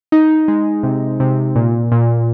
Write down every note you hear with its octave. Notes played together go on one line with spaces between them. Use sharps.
D#4
G#3
C3
C3
A#2
A#2